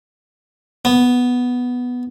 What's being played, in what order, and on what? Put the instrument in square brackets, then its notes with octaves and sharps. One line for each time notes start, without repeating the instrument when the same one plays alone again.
[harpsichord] B3